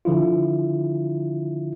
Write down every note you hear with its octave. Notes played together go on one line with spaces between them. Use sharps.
D3 F3 E4 F4